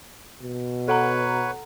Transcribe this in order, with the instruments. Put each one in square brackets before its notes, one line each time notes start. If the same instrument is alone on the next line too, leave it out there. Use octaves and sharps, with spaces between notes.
[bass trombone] B2
[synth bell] A4 F#5 A#5 [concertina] B4 C#5